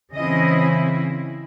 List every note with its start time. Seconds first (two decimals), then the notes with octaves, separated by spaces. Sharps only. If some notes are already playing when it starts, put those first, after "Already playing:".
0.14 C#3 E3 C4 E4 D#5